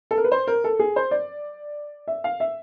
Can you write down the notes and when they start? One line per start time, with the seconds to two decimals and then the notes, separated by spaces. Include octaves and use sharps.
0.11 A4
0.17 A#4
0.24 B4
0.32 C5
0.47 A#4
0.64 A4
0.79 G#4
0.96 C5
1.11 D5
2.08 E5
2.24 F5
2.40 E5